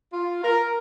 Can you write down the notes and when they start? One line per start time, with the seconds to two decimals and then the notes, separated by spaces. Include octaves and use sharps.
0.13 F4
0.43 A#4